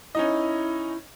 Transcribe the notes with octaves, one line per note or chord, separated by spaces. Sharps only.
C#4 D#4 E4 D#5